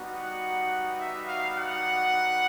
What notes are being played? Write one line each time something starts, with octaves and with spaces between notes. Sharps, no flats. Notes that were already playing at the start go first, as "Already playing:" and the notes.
Already playing: G3 B3 D#4 F#4
F#5
E5
F5
F#5